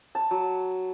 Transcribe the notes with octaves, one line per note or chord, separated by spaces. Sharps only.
A5
F#3